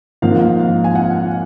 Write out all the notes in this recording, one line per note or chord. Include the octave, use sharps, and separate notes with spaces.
G#2 F3 A#3 F5
F5
G#5
F#5